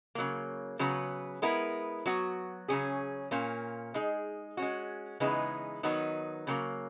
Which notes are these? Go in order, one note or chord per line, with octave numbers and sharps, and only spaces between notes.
C#3 F#3 A#3
C#3 F#3 B3
G#3 B3 E4 A#4
F#3 B3 F#4
C#3 F#3 C#4 G#4
A#2 A#3 C#4
G#3 D#4 G#4
G#3 C#4 F#4
C#3 E3 G#3 B3 D#4
D#3 F#3 B3 D#4
C#3 F#3 A#3